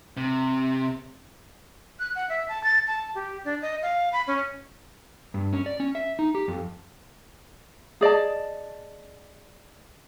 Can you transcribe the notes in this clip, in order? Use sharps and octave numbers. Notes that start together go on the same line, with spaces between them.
C3
F#6
F#5
E5
A5
A6
A5
G4
D4
D#5
F5
B5
C#4
G2
C#4
D5
C#4
E5
D#4
G4
F2
G#4 D5 D#5 A5